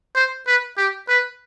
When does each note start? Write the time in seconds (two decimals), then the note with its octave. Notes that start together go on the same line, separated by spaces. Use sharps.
0.15 C5
0.47 B4
0.77 G4
1.08 B4